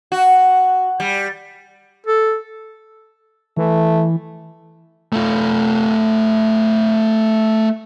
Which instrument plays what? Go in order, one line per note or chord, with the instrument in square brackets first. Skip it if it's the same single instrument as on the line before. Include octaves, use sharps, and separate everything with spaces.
[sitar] F#4
G3
[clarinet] A4
[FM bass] E3 [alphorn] A3
[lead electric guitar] A3 F4